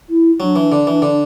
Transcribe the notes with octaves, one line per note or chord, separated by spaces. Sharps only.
E4
F#3 D4
E3
D3
E3
D3